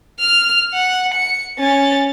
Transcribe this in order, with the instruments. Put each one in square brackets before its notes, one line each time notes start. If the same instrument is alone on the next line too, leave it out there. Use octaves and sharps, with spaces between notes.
[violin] F6
F#5
C#7
C#4 A6